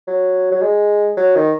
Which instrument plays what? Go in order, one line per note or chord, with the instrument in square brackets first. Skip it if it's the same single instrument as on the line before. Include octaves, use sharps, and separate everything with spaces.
[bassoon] F#3
F#3
G#3
F#3
D#3